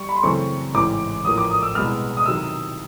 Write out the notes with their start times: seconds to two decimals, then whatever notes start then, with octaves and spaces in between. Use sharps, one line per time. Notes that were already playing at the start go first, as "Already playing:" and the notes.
Already playing: G3 C#6
0.09 B5
0.16 C6
0.23 F#2 C#3 E3 A3 C4 C#6
0.74 A1 G#2 E3 D6
1.25 A1 A2 F3 A#3 D#6
1.38 D6
1.51 D#6
1.63 E6
1.75 C2 B2 G#3 B3 F6
2.17 D#6
2.26 C3 D#3 F#3 E6